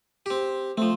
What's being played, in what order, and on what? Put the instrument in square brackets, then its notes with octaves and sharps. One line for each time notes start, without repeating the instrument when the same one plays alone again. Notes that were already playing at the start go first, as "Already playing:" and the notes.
[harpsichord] C4 G4
[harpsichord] F3 C4 [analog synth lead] A3